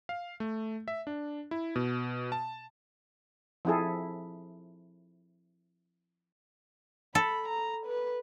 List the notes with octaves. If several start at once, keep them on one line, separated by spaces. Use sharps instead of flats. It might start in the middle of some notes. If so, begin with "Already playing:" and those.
F5
A3
E5
D4
E4
B2
A5
F3 C4 E4 G#4 A4
A4 B5
A#5
B4